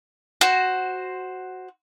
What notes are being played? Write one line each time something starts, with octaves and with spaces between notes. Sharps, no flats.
F#4 C5